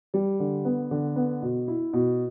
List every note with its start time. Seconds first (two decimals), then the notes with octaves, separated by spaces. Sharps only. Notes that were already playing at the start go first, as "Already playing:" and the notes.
0.14 G3
0.40 D3
0.65 B3
0.91 D3
1.16 B3
1.42 B2
1.68 E4
1.93 B2